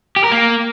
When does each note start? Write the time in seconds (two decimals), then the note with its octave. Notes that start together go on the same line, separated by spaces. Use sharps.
0.16 G4
0.24 A#4
0.31 A#3